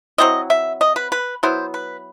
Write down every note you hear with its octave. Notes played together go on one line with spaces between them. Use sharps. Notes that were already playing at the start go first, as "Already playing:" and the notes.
F#3 C4 E4 D#5
E5
D#5
B4
B4
F#3 B3 E4 C5
B4